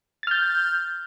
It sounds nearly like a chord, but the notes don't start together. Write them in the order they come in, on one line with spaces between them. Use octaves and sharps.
A6 F6 G6